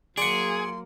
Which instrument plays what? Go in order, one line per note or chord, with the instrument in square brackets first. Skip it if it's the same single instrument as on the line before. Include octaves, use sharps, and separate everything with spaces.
[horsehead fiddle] F#3 A#3 [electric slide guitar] G#4 [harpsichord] D5 F#5 [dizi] C6